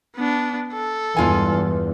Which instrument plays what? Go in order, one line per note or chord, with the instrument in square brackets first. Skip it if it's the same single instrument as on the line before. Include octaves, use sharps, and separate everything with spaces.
[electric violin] B3 D4
A4
[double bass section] E2 G2 [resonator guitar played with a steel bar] G#3 F4 G#5